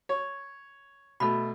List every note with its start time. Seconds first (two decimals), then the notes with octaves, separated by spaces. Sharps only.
0.09 C#5
1.20 B2 A3 A4 B5